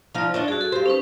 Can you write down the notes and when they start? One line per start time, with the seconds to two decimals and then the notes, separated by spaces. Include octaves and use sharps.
0.15 F3 D#4 F4 D5 F5
0.34 D4 C#5 D#5
0.48 G2 F#4 G#4
0.61 A4
0.72 G2 G4 C5 F5
0.86 C#4 D#4 B4